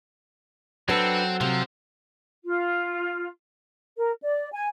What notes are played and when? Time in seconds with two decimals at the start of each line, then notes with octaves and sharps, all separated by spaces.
0.89 F#3 C4 D4 A4 B4
1.41 C3 F3
2.44 F4
3.96 A#4
4.21 D5
4.52 G#5